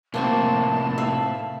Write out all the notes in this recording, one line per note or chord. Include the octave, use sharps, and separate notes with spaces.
A2 C3 A#3 C5 A5 C#6
E5 F5 B5